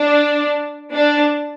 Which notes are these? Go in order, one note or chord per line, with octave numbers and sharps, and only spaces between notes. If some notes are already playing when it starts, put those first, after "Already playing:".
Already playing: D4
D4